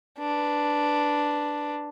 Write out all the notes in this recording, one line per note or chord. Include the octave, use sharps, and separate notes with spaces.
D4 B4